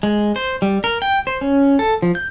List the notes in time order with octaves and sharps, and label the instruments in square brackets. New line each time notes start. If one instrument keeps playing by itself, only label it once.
[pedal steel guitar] G#3
C5
G3
A#4
G5
C5
C#4
A4
F3
G6